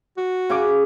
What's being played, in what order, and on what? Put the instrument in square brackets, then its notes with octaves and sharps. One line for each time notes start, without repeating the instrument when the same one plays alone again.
[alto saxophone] F#4
[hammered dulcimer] C#3 G#5 D6